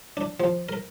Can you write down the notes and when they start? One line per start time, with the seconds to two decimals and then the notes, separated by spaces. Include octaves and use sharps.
0.17 D4
0.40 F3
0.69 A#4